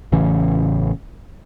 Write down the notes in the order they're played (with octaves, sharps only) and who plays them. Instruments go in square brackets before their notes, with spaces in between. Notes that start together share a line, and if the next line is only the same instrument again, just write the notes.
[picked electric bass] A1 C#3 E3 C#4